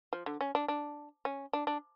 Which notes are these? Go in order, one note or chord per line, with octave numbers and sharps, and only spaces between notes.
F3
D3
C#4
D4
D4
C#4
D4
D4